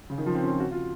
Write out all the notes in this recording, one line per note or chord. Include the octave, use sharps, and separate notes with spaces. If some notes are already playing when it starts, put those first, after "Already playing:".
C#3
D#3
F3
C4
C#4
F4
F#4
F4